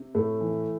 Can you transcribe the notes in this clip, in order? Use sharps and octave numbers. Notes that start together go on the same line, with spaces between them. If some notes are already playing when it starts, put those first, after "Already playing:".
Already playing: C3
A2 A3
E3